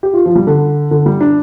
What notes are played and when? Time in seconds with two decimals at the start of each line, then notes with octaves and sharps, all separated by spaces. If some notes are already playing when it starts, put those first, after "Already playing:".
0.03 G4
0.14 F4
0.26 F3
0.35 G3
0.47 D3
0.91 D3
1.06 G3
1.21 D4